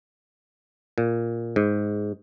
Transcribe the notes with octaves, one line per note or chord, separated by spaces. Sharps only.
A#2
G#2